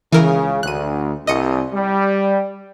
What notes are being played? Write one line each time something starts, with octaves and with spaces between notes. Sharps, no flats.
C#2 C#3 E3 A#4
D2 F#6 D#7
C2 D#5 D#6 C#7
G3